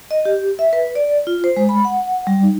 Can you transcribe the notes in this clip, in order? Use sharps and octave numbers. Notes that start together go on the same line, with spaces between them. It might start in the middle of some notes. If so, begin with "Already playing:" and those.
D#5
G4
E5
B4
D5
F4
C5
G#3
B5
F#5
G3
D#4